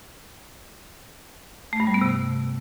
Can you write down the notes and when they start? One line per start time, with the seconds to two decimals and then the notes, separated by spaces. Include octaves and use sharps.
1.73 A3
1.80 G2
1.87 G3
1.94 B3
2.01 C3